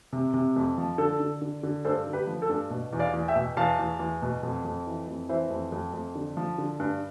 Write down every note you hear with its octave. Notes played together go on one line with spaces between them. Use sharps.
C3
C3
F2
F3
D3 A4
D3
D3
D3
G2 A4 C5
D3
G4 B4
F3
A4
G2
B2
E2
D5 F5
E2
E5 G5
B2
E2 F5 A5
E2
E2
B2
F2
F2
E3
F2
E3 C5 E5
F2
F2
F2
D3
F3
D3
G2